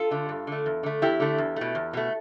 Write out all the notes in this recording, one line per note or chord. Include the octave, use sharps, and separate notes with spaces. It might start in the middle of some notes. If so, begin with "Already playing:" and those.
Already playing: F4 A4
D3 A3
G2
D3 A3
E2
D3 A3
E2 E4 G4
D3 A3
E2
B2 A3
E2
B2 A3